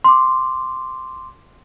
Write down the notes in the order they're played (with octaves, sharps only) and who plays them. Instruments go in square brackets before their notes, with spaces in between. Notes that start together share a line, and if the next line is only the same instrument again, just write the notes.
[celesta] C6 D6